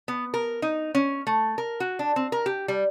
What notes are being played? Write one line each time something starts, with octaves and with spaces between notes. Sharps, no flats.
B3
A#4
D#4
C#4
A3
A#4
F#4
D4
C4
A#4
G4
G3